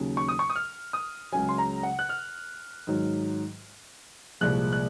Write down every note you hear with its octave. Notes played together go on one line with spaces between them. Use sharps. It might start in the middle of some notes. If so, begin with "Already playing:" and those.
Already playing: D#2 C#3 F#3
C#6
D#6
C#6
D#6
F6
D#6
C#2 C#3 F#3 G#5
C6
A#5
F#5
F#6
F6
G#2 D#3 F#3
C2 A#2 F3 G#3 F#6
F#6